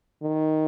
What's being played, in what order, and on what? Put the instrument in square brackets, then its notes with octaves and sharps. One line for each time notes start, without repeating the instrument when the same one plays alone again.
[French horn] D#3